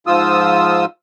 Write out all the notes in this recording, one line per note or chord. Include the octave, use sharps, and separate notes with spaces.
G#2 F3 F4 D#6 E6